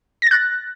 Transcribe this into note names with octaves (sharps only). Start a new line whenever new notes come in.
F#6 A6 A#6